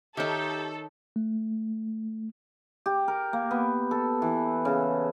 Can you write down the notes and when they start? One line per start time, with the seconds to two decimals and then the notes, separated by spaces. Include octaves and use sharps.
0.17 D#3 D#4 G4 A4 C#5 E5
1.16 A3
2.86 G4
3.08 A#4
3.33 A#3
3.51 B3
3.91 A4
4.22 E3
4.65 C#3